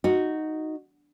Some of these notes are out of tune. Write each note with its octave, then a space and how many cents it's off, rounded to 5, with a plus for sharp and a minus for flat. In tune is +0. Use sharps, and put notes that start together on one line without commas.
D#4 +0 F#4 +0